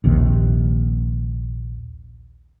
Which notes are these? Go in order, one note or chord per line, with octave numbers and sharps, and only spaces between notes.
A#1 D#2 C3